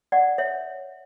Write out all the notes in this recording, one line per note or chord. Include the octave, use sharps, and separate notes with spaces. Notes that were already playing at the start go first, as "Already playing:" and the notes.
D5 F#5
C#5 E5